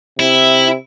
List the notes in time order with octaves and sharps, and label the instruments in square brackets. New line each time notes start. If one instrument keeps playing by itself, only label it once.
[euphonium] C3 [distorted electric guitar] E4